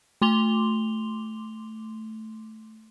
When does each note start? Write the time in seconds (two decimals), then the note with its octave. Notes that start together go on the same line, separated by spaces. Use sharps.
0.22 A3 C6 D6 F7 G7